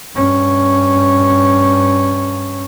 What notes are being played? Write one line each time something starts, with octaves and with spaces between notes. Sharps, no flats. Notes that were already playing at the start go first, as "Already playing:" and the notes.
G2 C#4